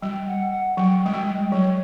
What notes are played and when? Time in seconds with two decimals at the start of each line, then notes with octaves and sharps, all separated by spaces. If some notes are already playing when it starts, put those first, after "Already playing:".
0.01 G3 G5
0.27 F#5
0.52 F#5
0.77 F#3 G5
1.02 G#3 G5
1.14 G3
1.27 G5
1.52 F#3 C#5